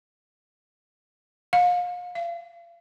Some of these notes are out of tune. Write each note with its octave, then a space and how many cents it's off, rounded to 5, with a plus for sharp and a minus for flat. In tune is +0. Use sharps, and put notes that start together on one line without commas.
F5 +35
F5 -35